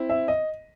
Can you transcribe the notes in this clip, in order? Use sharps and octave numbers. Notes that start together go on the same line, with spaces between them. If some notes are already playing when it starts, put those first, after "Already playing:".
Already playing: C4 E4
E5
D#5